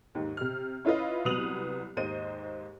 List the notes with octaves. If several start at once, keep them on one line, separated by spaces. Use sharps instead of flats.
D#2 G#2 D#3
C3 F6
C#4 E4 F4 B4 D#5
C2 F#3 B3 D#6 F7 F#7
D#2 G#2 C5 D#5 D#7